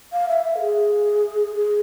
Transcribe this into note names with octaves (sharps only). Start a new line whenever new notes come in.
F5
E5
E5
A4
G#4
G#4